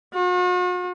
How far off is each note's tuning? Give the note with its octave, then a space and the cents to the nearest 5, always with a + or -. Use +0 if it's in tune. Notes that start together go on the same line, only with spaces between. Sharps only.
F#4 -45